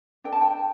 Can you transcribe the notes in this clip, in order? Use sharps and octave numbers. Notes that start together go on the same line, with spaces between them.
D4 A4 G5
A5
G5